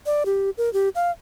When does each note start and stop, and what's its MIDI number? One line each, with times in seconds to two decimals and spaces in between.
0.06 0.24 74
0.26 0.50 67
0.58 0.72 70
0.73 0.89 67
0.95 1.11 77